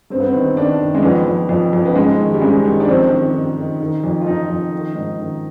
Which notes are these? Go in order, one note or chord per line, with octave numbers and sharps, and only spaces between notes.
G2 C4
B3
C4
D#3
D#3 D4
D#3
G#3
F2 B3
F2
F2
F2
B3
G#2 G#3
D#3
G3
G#2 G#3
D#3
D4
F2 C4
D#3
D#3
D#3
D#3
F2
F4
F2 D#4
F2
D#3
G#2
D#3